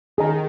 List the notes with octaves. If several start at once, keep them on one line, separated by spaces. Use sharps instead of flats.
D#3 G#4 D#5 A#5